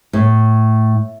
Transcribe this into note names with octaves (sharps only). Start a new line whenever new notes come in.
A2